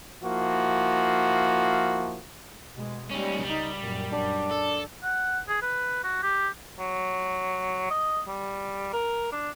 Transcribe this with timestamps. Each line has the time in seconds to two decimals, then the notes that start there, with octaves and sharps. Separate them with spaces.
0.23 F3 A#3 E4 F#4
2.75 B2 G#3
3.11 D#2 G3 G#3 C#4
3.44 C#2 G3 D#4
3.77 F#2 A#2
4.12 F#2 D4
4.51 A4
5.03 F#5
5.49 G#4
5.62 B4
6.04 F#4
6.23 G4
6.79 F#3
7.90 D#5
8.28 G3
8.93 A#4
9.32 D4